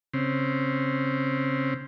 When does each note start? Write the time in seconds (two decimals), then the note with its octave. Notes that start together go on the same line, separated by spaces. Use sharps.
0.13 C#3 C4